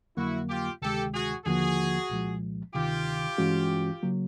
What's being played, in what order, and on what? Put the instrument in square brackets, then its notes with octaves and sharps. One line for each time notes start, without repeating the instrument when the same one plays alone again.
[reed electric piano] F2 D3 F#3 A#3 [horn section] E4 F#4
[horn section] F4 G4
[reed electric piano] D2 C3 D#3 G#3 [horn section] G4 A4
[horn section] F#4 G#4
[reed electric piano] D#2 D3 F3 A#3 [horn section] F#4 G#4
[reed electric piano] C2 A#2 F3 G#3
[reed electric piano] D2 C3 D#3 [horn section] F4 G4
[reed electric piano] G2 E3 G#3 C#4 F#4
C#3 F#3 A#3